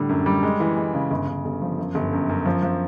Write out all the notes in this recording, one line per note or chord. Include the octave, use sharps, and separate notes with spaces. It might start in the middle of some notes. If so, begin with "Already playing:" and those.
Already playing: A2 D3 G3
F#2
G3
G#3
E3
G#3
C#3
G1
G1
G1
F3
F#2
G1
F#2
F#2
F3
F3